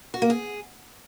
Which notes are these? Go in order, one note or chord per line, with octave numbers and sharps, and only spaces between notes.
F#4
A#3
G#4